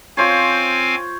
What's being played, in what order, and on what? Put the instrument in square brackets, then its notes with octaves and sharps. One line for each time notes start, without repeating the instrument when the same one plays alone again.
[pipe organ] C4 F5 G#5 [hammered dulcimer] F4 C5 C#5